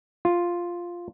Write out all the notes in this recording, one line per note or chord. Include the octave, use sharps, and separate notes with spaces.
F4